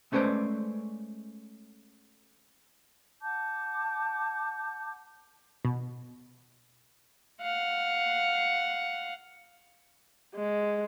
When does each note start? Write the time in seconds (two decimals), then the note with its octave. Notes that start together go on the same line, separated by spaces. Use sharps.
0.12 G#3 A3 C#4 B4 C5 D5
3.22 F#5 A5 D6 G6
5.65 B2
7.42 F5 F#5
10.35 G#3